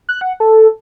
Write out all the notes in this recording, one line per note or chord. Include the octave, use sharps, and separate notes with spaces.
F#6
F#5
A4